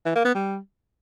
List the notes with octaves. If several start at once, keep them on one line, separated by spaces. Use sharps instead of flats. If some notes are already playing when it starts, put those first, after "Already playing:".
E3
A#3
B3
G3